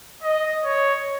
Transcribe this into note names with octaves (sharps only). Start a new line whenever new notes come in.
D#5
C#5